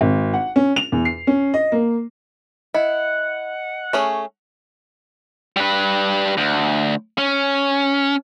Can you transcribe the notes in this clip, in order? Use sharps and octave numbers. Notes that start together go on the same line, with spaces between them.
G#1
F#5
C#4
F7
E2
C7
C#4
D#5
A#3
E4 D#5 F#5
A3 C#4 G#4
G3 B4
D2
C#4